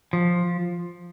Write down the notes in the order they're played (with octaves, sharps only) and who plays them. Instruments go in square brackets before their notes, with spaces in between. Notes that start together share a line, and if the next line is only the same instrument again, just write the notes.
[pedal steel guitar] F3